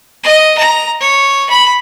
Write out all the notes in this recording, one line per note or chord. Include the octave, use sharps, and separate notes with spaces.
D#5
A#5
C#5
B5